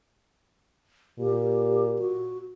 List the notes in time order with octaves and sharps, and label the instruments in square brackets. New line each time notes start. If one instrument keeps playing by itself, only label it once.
[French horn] A#2 [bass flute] G4
[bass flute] F#4